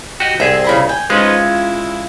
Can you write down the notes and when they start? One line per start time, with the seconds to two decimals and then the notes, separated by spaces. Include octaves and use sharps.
0.20 F#4 G4 D#5 G5
0.40 C2 C4 G#4 E5
0.64 C#3 E4 A#5
0.89 G5 G#5
1.10 G#3 C#4 D#4 F4 B4 C5
1.42 E4